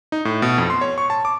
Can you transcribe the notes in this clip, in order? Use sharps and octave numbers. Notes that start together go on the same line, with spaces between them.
D#4
A2
B2
F2
C6
C#5
C#6
A5
D6